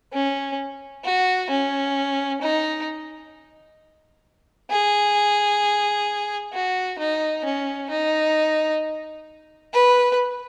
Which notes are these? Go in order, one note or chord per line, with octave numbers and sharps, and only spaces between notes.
C#4
F#4
C#4
D#4
G#4
F#4
D#4
C#4
D#4
B4